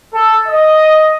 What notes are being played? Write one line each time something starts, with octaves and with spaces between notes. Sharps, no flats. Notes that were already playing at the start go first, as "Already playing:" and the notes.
A4
D#5